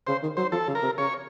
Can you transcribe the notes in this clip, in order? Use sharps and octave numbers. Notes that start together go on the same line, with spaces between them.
C#3 C5
D#3
F#3 C5
F3 A4
C#3
A#4
C3
C#3 C#5